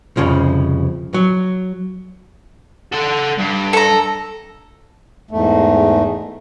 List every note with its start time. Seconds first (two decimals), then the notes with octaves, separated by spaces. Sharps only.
0.17 C2 F2 C#3 F3
1.14 F#3
2.92 A4 F#5
3.38 G2
3.73 A4 A#5
5.31 E2 G#2 A3